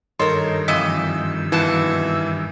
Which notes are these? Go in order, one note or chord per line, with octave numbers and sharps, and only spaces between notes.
G2 D#3 A4 A#4 C#5 D#5 C6
F2 E3 D#5 E6 B6
F2 B2 E3 A5